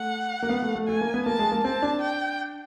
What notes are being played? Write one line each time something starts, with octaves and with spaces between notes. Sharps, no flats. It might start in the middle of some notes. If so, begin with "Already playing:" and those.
Already playing: A3 F#5
A#3
B3
A3
A3
A3 G#5
A#3
B3
A#3 A5
G#3
A#3
C4 A5
D4
G5